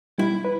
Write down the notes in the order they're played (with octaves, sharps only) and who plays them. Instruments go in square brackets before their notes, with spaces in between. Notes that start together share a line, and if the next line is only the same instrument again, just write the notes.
[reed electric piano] G3 [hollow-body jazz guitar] E4
[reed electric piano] B4